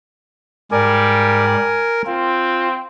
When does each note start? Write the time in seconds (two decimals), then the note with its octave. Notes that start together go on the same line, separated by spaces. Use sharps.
0.72 G#2 G3 A#4 D5 G#5
2.07 C4 F4